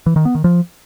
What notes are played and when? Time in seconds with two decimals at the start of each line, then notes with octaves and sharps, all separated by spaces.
0.06 E3
0.16 D#3
0.25 B3
0.35 D#3
0.44 F3